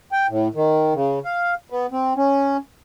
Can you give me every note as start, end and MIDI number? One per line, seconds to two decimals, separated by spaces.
0.12 0.27 79
0.29 0.48 45
0.55 0.93 51
0.94 1.19 49
1.25 1.54 77
1.70 1.86 59
1.92 2.13 60
2.16 2.57 61